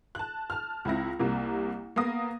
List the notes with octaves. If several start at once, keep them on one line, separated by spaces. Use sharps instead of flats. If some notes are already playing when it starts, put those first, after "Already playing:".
A5 F#6
A5 F6
C#2 C4 E4 A#6
C2 C3 A#3
A#3 B3 F5 D#6 A#6